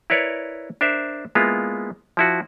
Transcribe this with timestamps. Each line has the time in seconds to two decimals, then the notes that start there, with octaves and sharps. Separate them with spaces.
0.10 E4 A#4 B4 C#5 D5
0.81 D4 A#4 C5 E5
1.35 G#3 A#3 B3 E4 F4
2.17 F3 E4 F#4